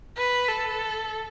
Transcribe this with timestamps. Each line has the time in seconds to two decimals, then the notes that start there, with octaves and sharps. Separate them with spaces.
0.17 B4
0.48 A4